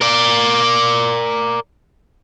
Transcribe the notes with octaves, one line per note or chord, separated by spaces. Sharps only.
A#4 D5